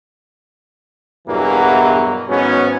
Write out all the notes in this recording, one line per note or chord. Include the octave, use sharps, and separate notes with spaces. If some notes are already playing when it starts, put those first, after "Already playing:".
E2 G2 B2 E3 F#3 A#3
G#1 G#2 F#3 B3 C#4